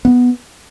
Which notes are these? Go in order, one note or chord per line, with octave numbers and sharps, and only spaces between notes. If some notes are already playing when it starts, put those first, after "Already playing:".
B3